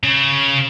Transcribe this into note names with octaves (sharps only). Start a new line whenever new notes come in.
C#3